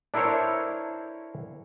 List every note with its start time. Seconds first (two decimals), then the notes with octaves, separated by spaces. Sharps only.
0.14 D4 E4 A4 A#4 C5 C#5